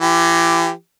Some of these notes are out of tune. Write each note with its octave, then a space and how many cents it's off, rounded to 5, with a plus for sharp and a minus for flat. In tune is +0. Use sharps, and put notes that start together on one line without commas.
E3 +35 G4 +0